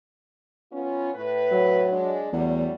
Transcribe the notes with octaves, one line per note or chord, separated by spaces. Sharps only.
B3 C#4 F4
A2 B4
F#3
G#3 D4
E2 F#3 G3 A3